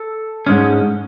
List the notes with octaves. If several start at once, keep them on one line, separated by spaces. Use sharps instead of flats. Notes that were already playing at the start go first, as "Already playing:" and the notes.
Already playing: A4
G#2 G#3 C#4